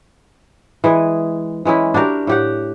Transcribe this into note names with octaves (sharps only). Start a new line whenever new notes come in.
E3 G#3 G#4
E3 G#3 C#4 E4
D4 F#4 G4 A#4
A2 G4 F#5